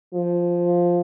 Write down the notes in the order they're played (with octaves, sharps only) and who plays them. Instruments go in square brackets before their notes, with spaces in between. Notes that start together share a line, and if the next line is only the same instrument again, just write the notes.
[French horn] F3